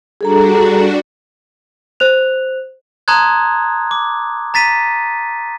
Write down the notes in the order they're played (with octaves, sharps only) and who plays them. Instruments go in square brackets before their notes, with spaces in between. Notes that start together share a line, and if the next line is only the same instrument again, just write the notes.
[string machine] G3 D4 F#4 [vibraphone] G#4 A4 A#5
[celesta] C5 F#6 F7
[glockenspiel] A5 A#5 C6 D#6 F#6 G#6
D6
A#5 A6 B6 D#7